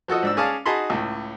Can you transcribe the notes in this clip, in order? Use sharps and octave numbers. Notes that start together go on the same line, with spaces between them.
F3 F#4 A4 D#5
G#2 D4 E6
C#4 G#4 D5 F5 A5
D#4 F#4 G#4 A5 B5 C6
C#2 A2